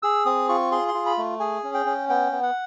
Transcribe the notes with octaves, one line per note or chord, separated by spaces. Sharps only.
G#4 E6
C4 D#6
F4 C#6
G#4 C6
C6
F4
B5
A3
G#4 G#5
C#4
G5
C#4
B3 G5
B3
F#5